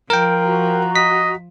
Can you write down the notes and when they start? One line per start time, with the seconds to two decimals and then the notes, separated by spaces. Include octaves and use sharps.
0.10 F3 A#4 G5
0.43 F#4 A#5
0.96 D#5 B6